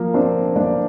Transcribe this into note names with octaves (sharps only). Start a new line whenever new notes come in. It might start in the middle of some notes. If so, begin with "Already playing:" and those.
Already playing: F3 A#3 A#4
C4 D4 C5
A#3 D4 D5